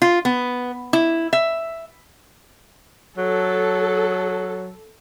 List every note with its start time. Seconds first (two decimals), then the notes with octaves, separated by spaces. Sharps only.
0.02 F4
0.25 B3
0.93 E4
1.33 E5
3.18 F#3 A4